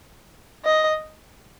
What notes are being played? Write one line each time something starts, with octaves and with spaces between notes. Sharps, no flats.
D#5